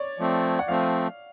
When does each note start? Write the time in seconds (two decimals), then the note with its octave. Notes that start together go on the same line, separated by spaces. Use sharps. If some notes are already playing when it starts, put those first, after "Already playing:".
Already playing: C#5 D5
0.19 F3 A3 C4
0.59 F#5
0.68 F3 A3 C4 F5